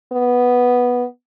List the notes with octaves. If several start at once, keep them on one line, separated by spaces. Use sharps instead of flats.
B3